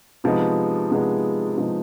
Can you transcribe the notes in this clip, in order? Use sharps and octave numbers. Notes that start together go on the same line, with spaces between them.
C3 F3 G#3 B3 D#4
C3 F3 G#3 B3 D#4
C3 F3 G#3 B3 D#4